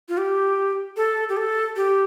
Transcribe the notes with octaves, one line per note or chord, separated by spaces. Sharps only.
F4
G4
A4
G4
A4
G4